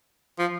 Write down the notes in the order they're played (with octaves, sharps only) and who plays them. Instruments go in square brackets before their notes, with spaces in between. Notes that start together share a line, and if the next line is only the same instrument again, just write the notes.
[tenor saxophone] F3